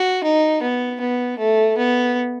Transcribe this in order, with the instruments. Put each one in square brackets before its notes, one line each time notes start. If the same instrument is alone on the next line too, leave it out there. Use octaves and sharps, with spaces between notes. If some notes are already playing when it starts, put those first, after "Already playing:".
Already playing: [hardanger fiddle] F#4
D#4
B3
B3
A3
B3